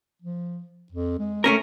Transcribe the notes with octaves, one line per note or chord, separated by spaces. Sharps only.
F3
F2
G#3
A3 C#4 A#4